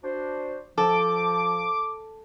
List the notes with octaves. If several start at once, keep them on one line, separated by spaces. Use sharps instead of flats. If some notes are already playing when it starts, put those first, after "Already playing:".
D4 F#4 C5
F3 A4 D6